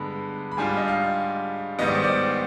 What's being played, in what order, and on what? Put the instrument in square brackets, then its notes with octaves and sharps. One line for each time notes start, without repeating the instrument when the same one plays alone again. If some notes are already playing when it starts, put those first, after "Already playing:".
Already playing: [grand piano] G2 D3 G#3 B3 B5
B5
G#2 G3 D4 F4 G#5
D#5
F5
G#2 D#3 G3 B3 D#5
D5
C5
D5